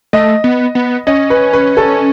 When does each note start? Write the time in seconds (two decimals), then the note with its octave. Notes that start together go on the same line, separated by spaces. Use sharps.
0.13 A3 D#5
0.44 B3
0.75 B3
1.07 C#4 D#5
1.30 B4
1.53 B4
1.77 A4